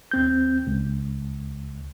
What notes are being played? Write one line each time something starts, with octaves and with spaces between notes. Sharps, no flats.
D#2 C4 G6
C#2